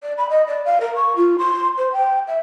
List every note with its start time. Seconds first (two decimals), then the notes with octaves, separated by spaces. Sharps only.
0.03 D5
0.18 B5
0.29 D#5
0.47 D5
0.65 F5
0.81 A#4
0.96 C#6
1.16 F4
1.38 C6
1.78 C5
1.92 G5
2.28 E5